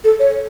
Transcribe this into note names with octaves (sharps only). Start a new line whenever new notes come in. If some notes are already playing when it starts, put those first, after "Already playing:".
A4
C#5